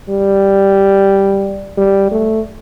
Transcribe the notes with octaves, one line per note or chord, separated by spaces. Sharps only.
G3
G3
A3